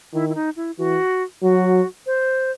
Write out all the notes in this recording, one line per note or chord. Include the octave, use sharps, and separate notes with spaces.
D#3 E4
E4
D#4
E4
E3 F#4
F#3 F#4
C5